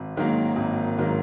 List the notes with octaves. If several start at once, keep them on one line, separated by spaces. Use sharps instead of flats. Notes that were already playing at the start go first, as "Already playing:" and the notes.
Already playing: G#1
G#2 D#3 F#3 A#3
G#1
G#2 D#3 F#3 A#3